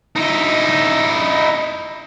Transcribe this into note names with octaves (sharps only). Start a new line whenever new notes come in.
D#4 E4